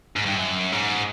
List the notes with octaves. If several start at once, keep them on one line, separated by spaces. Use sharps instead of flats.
G#2
G2
F#2
G#2